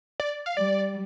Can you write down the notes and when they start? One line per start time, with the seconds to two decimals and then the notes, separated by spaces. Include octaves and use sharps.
0.20 D5
0.46 F5
0.57 G3 D5